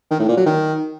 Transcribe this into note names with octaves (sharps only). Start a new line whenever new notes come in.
D#3
A2
A#2
F#3
D#3